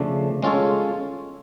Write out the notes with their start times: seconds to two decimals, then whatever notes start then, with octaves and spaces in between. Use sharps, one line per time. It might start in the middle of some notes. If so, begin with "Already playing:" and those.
Already playing: C#3 F3 A3 D4
0.42 G#3 C#4 F4 A4 C#5